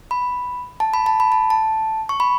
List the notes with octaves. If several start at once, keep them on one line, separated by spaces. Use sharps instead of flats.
B5
A5
B5
A5
B5
A5
A5
C#6
B5